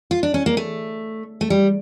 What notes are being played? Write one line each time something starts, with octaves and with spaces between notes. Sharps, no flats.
F4
D4
C#4
A#3
A3
A3
G3